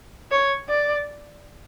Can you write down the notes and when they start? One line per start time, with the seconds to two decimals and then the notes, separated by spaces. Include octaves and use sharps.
0.31 C#5
0.69 D5